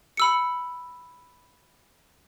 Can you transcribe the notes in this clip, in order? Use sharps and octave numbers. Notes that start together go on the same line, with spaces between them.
B5 E6 C#7